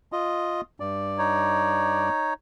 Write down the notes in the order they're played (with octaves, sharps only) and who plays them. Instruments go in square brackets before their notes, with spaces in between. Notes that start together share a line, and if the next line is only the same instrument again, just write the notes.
[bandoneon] F4 D#5
G2 D5
[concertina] D#4 C#5